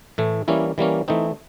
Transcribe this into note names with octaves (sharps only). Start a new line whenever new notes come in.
A2 E3 A3
E3 G3 A#3 C#4 E4
E3 G3 A#3 C#4
E3 A3 C4 D#4